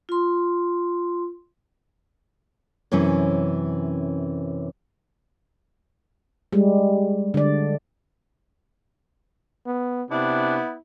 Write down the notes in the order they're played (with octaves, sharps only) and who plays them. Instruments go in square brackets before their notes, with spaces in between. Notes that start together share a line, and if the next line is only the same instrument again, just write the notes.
[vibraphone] F4 C6
[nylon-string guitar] F#2 C3 E3 C#4
[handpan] G3 G#3
D3 D5
[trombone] B3
[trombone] C3 [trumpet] B3 [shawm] D4 [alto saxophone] E4